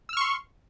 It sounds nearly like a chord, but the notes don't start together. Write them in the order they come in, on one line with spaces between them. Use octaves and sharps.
E6 F6 C#6 C6